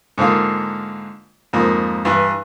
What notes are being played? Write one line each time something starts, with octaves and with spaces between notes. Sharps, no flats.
G#2 D3 A#3 F4
F2 G#2 A#3
G2 E3